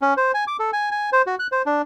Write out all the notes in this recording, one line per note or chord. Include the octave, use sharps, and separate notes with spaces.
C#4
C5
G#5
D6
A4
G#5
G#5
C5
F#4
F#6
C5
D4